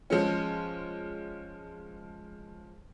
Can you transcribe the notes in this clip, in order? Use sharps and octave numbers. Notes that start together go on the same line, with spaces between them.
F3 G#3 C#4